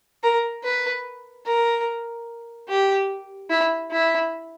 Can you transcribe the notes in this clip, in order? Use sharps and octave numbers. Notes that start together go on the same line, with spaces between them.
A#4
B4
A#4
G4
E4
E4